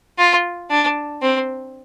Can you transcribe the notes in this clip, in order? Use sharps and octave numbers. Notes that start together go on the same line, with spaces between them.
F4
D4
C4